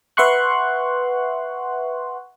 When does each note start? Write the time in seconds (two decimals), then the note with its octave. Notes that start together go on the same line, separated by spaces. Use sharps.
0.17 B4 E5 F#5 C6 C#6 F#6